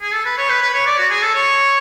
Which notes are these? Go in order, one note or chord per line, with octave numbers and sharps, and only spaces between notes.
G#4
A4
B4
C#5
B4
B4
C#5
D5
F#4
G#4
A4
C#5